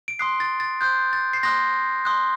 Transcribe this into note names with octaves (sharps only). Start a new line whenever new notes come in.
D7
C6 D#6 F#6 C7
A6
A6
C6 D#6 F#6 G6
A6
C7
C6 D#6 F#6 A#6
C6 D#6 F#6